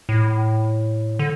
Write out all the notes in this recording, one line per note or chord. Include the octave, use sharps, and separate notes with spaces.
A2
D3